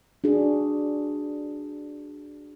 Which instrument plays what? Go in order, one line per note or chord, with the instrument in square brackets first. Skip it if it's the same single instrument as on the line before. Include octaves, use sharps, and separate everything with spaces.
[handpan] D4 F#4 G#4